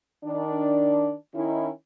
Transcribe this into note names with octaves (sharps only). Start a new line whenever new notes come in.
D#3 D4
D#3 C#4 D#4 E4